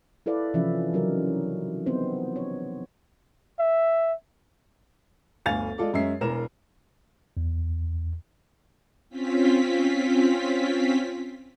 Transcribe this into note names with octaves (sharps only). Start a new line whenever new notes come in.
E4 A4 B4 D5 F5
C3 E3 F3 C#4 E5
C#3 F#3 D#4 A#4
B3 C4 D#4 C5
C#5
E5
G1 D2 F5 G#5 A6 F7
G#3 F4 A4 D5
F#2 G#3 C#4 E5 C7
E1 E2 A#4 A#5 E7
E2
C4 C#4 F4 B6